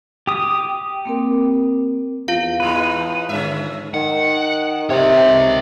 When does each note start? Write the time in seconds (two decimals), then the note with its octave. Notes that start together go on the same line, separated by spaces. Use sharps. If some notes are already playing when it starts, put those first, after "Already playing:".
0.27 G4 D#6
0.69 G5
1.05 A#3 C4 A#4
2.28 E2 F4 F5
2.60 A2 E3 G#3 D#4 B4
3.29 G#2 D3 C#4 E5
3.94 D#3 F#5
4.90 C3 C#5 D#5